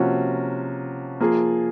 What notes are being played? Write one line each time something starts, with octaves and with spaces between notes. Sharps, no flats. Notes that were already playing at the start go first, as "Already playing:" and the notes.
Already playing: C3 F3 A#3 C#4 F#4
F3 A#3 F4 G#4